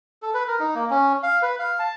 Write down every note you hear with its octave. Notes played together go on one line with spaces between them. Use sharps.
A4
B4
A#4
D#4
A#3
C#4
F5
B4
F5
A5